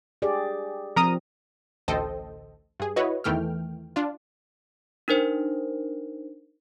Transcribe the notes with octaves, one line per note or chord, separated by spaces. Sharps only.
G4 G#4 D5
F3 C4 A#4 A#5 D#6
A1 D2 A4 C5 D#5 G5
G2 G#4
E4 F#4 B4 C#5 D#5
E2 D#3 E3 A3 G5 F6
D4 F4
D4 D#4 A#4 C5